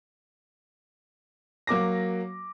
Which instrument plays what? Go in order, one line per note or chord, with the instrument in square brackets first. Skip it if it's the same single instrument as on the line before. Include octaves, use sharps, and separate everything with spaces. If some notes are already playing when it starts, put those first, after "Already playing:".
[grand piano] F#3 A#3 D6 A#6